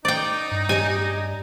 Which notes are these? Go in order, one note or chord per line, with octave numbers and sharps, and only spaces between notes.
D#4 D5 G5
G2
G4 D5 D#5 G#5